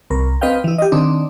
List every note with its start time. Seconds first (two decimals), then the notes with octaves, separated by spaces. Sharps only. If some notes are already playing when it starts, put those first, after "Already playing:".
0.10 C2 A#4
0.41 C4 B4 D#5 F5 G5
0.64 E3 E4
0.78 G4 D#5
0.92 D#3 C4 D4 D#4